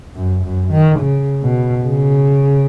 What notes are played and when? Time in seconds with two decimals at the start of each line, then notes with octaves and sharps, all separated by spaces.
0.15 F#2
0.44 F#2
0.71 D#3
1.00 C#3
1.43 B2
1.85 C#3